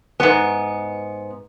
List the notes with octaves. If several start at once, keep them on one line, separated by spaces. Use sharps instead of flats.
G#2 B3